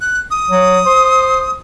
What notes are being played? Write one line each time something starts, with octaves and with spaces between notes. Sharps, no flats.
F#6
D#6
F#3
C5